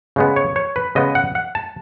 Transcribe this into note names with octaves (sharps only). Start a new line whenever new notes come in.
C#3 G#3 B3
C#5
C#5
B4
C#3 G#3 B3 D#5
F#5
F#5
A5